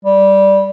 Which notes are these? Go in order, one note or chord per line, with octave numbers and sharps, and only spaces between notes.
G3